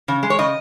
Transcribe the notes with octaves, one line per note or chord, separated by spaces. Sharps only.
C#3
G#3
C#5
C#3 D#5